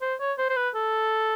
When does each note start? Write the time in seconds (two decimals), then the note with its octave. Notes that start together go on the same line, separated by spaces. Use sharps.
0.02 C5
0.20 C#5
0.38 C5
0.49 C5
0.57 B4
0.75 A4